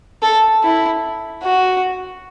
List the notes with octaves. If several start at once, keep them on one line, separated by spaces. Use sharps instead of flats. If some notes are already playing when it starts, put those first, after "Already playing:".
A4
E4
F#4